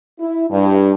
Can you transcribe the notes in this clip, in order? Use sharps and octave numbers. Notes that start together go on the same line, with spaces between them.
E4
G2